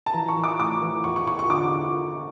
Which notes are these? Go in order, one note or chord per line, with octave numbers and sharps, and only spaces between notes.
A5
E3 A#5
C#6
E3
D6
A2 D6
E3
E2 C#6
C#6
E2 C#6
C#6
D3 D6